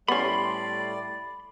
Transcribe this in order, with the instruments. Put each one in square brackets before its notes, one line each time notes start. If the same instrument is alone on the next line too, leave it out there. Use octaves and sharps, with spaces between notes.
[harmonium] A2 G3 A3 [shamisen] B3 C#4 [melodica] D5 [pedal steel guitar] B5 C6